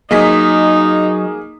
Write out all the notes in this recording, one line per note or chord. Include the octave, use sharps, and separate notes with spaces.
F#3 A#3 D#4 G#4 D#5 B6